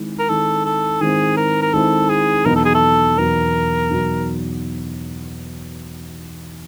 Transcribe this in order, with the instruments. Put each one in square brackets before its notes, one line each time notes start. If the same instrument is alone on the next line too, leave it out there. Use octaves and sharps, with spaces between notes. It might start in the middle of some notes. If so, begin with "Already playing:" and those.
Already playing: [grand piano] D#3 G#3 C4 E4
[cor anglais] A#4
[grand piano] D#3 G#3 C4 E4 [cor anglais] A4
[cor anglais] A4
[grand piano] D#3 G#3 C4 E4 [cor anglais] G#4
[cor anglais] A#4
A#4
[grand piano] D#3 G#3 C4 E4 [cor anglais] A4
[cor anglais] G#4
[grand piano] E2 B2 F#3 B3 D#4 [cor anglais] A#4
[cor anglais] A4
G#4
A4
[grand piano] E2 B2 F#3 B3 D#4 [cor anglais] A#4
[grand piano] B2 F#3 B3 D#4